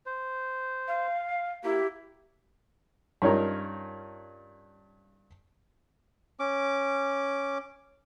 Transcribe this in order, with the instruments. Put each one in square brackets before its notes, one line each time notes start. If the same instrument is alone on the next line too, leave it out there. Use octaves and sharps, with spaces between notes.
[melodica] C5
[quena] F5
[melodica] A#3 [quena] E4 [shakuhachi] G4
[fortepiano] G2 C#4 D#4 F4 A#4
[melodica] C#4 D6